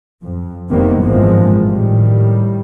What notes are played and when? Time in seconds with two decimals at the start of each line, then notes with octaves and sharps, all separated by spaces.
0.23 F2
0.70 F1 C3 D#3 G3 A#3 B3
1.02 G#1 G2 A#2 E3 F3 G#3
1.68 A2 D#3 G3